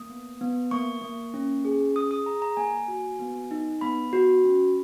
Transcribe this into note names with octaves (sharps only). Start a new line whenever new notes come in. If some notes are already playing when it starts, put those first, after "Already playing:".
Already playing: A#3 D#6
B3
B3
A#3 C#6
A#3
C#4
G#4
G#4 D#6
D#6
G#4 A#5
A#5
A#3 G#5
F#4
B3
D#4
B3 B5
F#4
C#4